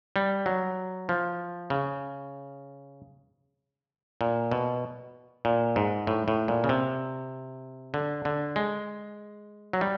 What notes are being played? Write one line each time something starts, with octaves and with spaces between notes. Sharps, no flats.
G3
F#3
F3
C#3
A#2
B2
A#2
G#2
A2
A2
A#2
C#3
C3
D3
D3
G#3
F#3
G3